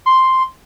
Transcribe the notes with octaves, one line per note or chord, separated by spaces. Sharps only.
C6